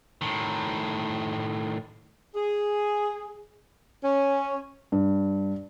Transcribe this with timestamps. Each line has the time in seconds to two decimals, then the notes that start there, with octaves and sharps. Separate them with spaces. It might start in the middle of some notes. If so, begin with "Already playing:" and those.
0.21 A2 D#3
2.34 G#4
4.04 C#4
4.92 G2